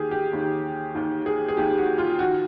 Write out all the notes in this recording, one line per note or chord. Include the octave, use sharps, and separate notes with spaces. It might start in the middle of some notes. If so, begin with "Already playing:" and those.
Already playing: D#2 D#3 G4 G#4
G4
D#2 D#3
D#2 D#3
G#4
G#4
D#2 D#3 G4
F#4
F4
D#3 F#4